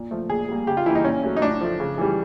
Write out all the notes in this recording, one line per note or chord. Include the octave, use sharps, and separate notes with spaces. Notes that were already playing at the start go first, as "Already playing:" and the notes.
Already playing: A#2
F3 A3
A#2 G#4
G3 A#3
C#3 G4
F4
E3 G3 A#3 E4
D#4
A#2 C#4
F#3 A3
D#4
A2 D4
F3 A3
C#3
E3 G3